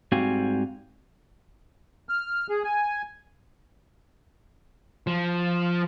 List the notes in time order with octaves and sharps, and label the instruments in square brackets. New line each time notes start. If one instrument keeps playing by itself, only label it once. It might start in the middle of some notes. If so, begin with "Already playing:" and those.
[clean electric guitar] G#2 G3 C4 F#4 F5 G#5
[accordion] F6
G#4
G#5
[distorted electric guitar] F3